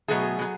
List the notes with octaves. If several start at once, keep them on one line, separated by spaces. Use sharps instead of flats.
B2 F#3 A3 G#4
B2 F#3